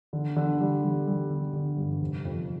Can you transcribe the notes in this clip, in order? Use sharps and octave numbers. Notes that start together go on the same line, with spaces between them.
D3
D3
G3
G3
G3
D3
D3
G2
F1
F2